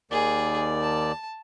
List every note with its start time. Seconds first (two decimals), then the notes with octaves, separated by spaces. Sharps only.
0.11 D#2 D#3 G#4 D5
0.81 A5